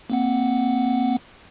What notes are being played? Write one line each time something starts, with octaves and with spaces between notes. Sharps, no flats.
A#3 C4 F#5